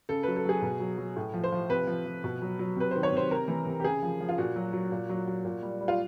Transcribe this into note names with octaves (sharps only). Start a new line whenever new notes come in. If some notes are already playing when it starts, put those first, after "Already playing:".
C#3 A4
F#3 B4
A4
F#3 G#4
B2
F#3
F#3
A2
F3
C5
F3
C3 B4
F3
F3
B2
F#3
F#3
C3 B4
D#3 C5
C#5
C3 C5
C3 A#4
E3
C3
G4
C#3 G#4
F3
F3
F4
A#2 F#4
F#3
F#3
A#2
F#3
F#3
A#2
G3
G3
F4